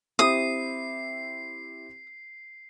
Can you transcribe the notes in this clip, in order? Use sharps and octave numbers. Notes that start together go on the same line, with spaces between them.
C4 E4 G4 D#6 C7